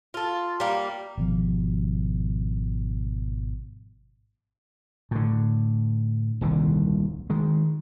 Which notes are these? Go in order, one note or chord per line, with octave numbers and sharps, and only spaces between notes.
F4 A4
G3 A#3
G#1 B2 F3
A2 D3
D#1 C2 D3 D#3
D#3 G#3